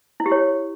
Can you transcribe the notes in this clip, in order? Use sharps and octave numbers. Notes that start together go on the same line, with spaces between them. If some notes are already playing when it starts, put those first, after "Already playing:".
E4
G4
C#5